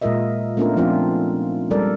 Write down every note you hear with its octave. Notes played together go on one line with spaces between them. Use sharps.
A#2 G#3 F4 A#4 D#5 E5
A3 B3 C#4 D4 F4 A#4
F3 G#3 C4 D4 D#4 F4
G3 G#3 A4 A#4 D5